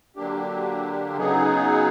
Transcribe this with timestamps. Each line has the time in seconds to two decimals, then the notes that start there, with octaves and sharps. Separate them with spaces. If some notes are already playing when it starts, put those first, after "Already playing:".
0.16 D3 F#3 A#3 D4 G4
1.17 C#3 F#3 B3 D#4 G#4